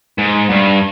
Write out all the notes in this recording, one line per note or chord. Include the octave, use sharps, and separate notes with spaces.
G#2
G2